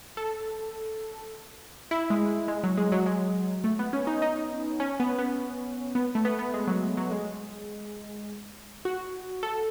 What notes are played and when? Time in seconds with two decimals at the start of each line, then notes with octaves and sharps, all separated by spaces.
0.17 A4
1.91 E4
2.10 G#3
2.48 G#3
2.63 F#3
2.77 G#3
2.92 F#3
3.06 G#3
3.64 A3
3.79 B3
3.93 C#4
4.07 D#4
4.22 D#4
4.80 C#4
5.00 B3
5.19 B3
5.95 B3
6.15 A3
6.25 B3
6.39 B3
6.54 G#3
6.68 F#3
6.97 F#3
7.11 G#3
8.85 F#4
9.43 A4